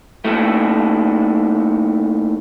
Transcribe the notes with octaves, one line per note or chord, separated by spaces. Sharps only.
D#2 A2 A3